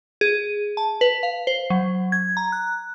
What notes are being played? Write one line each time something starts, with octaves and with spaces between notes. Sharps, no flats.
G#4
A5
B4
F5
C5
F#3
G#6
A#5
F#6